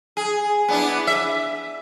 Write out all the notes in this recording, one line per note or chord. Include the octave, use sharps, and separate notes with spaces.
G#4
B3 D4 E4
E5